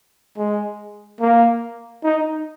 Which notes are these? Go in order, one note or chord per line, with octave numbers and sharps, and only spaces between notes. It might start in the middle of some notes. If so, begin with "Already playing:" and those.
G#3
A#3
D#4